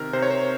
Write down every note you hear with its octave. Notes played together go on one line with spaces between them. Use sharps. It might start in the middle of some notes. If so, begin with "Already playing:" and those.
Already playing: C3 D#3 A#4
C3 C5
C#5
C5